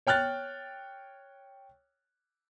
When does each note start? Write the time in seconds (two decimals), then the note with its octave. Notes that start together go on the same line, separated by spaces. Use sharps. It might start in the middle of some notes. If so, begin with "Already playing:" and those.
0.07 C#5 G5 F6 F#6 A6